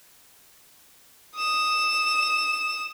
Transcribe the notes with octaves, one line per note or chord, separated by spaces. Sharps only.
D#6 E7